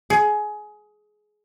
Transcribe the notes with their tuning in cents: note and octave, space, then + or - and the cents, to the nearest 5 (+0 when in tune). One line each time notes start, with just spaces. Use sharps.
G#4 +20